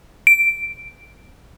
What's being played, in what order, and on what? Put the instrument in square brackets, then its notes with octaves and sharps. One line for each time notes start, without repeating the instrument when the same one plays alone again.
[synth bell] D7